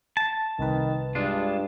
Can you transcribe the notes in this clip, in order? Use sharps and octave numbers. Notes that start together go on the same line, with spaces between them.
A5
C2 D#3 B4
G2 G#3 D4 F4